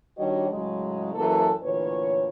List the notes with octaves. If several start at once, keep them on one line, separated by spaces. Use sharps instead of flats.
D#3 G3 D4 F#4 C#5 D#5
A2 C#3 F#3 G#3
F#2 E3 A#3 G#4 A4
D2 A#2 E3 B4 C#5